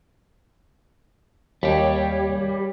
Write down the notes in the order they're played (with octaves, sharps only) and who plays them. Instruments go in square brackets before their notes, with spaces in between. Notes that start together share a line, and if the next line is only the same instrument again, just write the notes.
[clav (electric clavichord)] D#2 [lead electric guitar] G3 G4 [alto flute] C#5